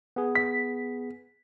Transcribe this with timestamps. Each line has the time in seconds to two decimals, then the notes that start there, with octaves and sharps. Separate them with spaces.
0.16 B3 G#4
0.35 B6